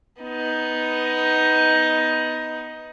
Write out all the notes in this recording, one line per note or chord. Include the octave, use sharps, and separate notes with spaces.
B3 D#4